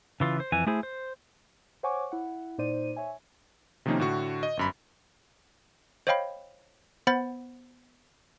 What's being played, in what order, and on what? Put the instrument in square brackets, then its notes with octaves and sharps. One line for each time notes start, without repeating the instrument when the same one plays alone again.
[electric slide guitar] C#3 E3 F4
C5
F2 E3 G#5
A3 E4 G#4 C5
C5
[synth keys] C5 C#5 F#5 G#5 C#6 D6
E4 F#5
A#2 D#4 C5 D5 D#7
C#5 E5 G#5
[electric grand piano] C3 D#3 F3 A#3 C#4 D#4
A2 D3 F#4 C#6
D#5
G1 F#2 B5
[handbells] C5 C#5 D#5 F5 G5 B5
B3 C5 F#5 B5 A6